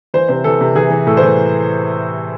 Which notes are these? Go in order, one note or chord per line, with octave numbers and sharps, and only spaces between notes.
E3 C5
C3 C5
E3 A4
C3
E3 G#4
E3
A2 A4
C5
E3